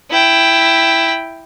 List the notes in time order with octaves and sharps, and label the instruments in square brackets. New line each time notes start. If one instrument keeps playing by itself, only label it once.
[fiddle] E4 G5